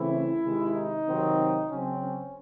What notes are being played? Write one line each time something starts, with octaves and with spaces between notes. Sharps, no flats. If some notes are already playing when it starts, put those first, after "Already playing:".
Already playing: C#3 E3 A3 C4 E4
C3 D#3 G#3
D#4
C3 D#3 F#3 C4
C#3 F#3 C4 C#4
C#4